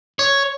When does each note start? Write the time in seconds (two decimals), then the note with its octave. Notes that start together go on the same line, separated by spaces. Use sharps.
0.19 C#5